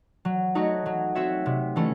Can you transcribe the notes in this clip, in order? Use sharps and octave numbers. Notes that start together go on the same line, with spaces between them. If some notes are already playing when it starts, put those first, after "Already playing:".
F#3
A3 D#4 F#4 C#5
F#3
C4 F#4 C#5 E5
C3
E3 A3 C#4